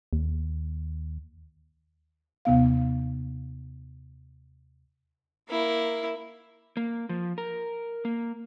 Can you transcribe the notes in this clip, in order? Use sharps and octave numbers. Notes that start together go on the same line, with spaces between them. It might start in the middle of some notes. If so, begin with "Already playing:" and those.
D#2
D#2 C3 B3 F5
A#3 E4
A#3
F3
A#4
A#3